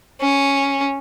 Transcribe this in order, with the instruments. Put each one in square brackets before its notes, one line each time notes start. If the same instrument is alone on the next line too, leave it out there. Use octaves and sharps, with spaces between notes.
[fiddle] C#4